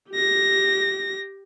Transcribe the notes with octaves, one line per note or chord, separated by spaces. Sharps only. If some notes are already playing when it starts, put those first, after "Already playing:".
G4 A#6